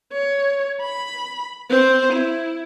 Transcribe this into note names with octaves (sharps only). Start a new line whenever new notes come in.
C#5
B5
C4 C5
E4